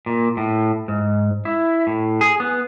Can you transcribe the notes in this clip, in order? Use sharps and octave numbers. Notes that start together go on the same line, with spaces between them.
A#2
A2
G#2
E4
A2
G#4
B3